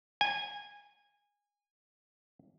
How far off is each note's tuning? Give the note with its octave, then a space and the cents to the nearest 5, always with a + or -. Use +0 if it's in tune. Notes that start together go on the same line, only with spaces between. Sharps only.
G#5 -20